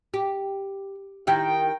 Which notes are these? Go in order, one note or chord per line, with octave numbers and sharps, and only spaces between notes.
G4
D#3 E4 G4 G5